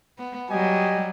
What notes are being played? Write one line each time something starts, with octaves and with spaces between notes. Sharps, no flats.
B3
F#3 G3 G4 D#5 G#5